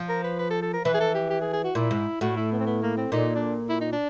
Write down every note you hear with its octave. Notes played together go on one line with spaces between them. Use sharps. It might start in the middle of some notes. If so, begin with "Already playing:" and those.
Already playing: F3
A#4
B4
B4
A4
A4
A#4
E3 B4
G#4
A4
G4
G4
G#4
G#4
F#4
A#2 E4
G#2
A2 F#4
E4
B3
C4
B3
A#3
C4
A#2 D#4
D4
E4
D#4
D4